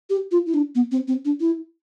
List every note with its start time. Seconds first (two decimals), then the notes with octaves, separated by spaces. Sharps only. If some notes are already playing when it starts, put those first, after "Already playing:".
0.10 G4
0.32 F4
0.46 E4
0.54 D4
0.75 B3
0.92 C4
1.08 C4
1.25 D4
1.40 E4